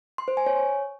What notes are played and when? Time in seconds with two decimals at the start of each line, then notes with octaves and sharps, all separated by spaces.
0.18 C6
0.28 C5
0.37 G#5
0.46 C#5